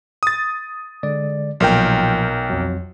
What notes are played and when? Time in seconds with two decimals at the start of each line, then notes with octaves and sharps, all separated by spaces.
0.23 D#6 A6
1.03 D3 G#3 D5
1.60 B1 A#2 F3 F#3 A#4 G5
2.49 F2 F#3